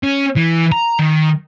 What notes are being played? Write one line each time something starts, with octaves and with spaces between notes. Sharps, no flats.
C#4
E3
A#5
D#3